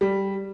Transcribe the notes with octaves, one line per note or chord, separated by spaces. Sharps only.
G3